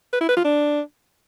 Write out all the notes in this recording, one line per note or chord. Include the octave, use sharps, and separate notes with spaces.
B4
E4
B4
F4
D4